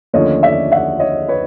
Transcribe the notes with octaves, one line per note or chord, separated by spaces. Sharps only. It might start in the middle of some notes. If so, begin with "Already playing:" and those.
D#2 D3 F3 A3 C#4 C#5 D#5
D5 E5
E5 F#5
C#5 D#5
B4 C#5